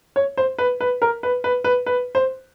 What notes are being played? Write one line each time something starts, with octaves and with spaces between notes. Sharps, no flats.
C#5
C5
B4
B4
A#4
B4
B4
B4
B4
C5